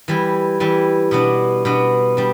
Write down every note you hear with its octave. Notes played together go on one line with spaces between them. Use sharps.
E3 G3 E4
E3 G3 E4
B2 B3 D4
B2 B3 D4
G3 D4